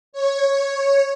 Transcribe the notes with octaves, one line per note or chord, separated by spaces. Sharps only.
C#5